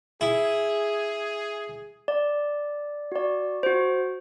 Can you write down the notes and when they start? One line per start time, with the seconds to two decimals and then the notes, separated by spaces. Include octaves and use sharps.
0.21 E4 G#4
2.08 D5
3.12 F#4 D5
3.63 F#4 C5